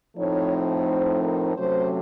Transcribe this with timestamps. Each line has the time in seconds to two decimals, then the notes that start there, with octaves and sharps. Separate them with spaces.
0.17 A2 F3 A3 C4 D#4 C#5
0.87 C5
1.22 A#4
1.56 C3 F#3 A3 C#4 C5